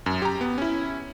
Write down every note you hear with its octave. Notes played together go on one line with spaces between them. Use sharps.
F#2
G4 A#5
B3
C#4 E4